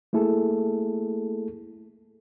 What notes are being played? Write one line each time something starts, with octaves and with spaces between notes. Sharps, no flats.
A3 A#3 E4 G#4 A4